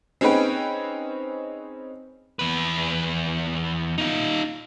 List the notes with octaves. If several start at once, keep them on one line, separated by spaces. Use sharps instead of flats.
C4 C#4 D#4 G#4 B4 G5
E2 B4
D#4 F4